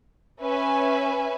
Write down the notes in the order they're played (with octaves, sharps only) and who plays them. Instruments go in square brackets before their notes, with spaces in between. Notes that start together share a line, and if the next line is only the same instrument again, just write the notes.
[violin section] C#4 B4 E5 G#5